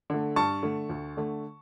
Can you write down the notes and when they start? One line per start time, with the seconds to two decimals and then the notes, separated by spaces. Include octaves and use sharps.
0.10 D3 A3
0.36 G2 A5 C#6
0.63 D3 A3
0.90 D2
1.17 D3 A3